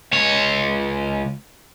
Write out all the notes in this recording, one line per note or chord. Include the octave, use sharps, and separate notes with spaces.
C#2 C#5